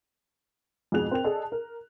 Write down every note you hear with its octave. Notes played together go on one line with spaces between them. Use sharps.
F2 G#2 B2 G#4 F#6 F7
C4 A#4 G5 F7
G#4 A4 D5 D#5 A5
A#4